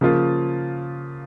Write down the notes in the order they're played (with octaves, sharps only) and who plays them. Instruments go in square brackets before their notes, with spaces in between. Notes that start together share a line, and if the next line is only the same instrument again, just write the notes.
[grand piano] C#3 F3 A#3 F4